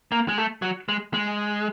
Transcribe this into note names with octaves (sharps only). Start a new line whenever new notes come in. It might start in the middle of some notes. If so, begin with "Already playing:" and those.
A#3
G#3
A3
F#3
G#3
G#3